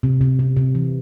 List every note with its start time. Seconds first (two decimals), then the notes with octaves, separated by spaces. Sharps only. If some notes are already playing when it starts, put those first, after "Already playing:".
0.03 C3
0.21 C3
0.39 C3
0.57 C3
0.75 E3